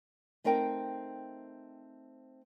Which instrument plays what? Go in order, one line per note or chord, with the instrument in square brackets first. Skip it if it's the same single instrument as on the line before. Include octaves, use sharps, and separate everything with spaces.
[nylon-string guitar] A3 C4 D#4 A#4 G5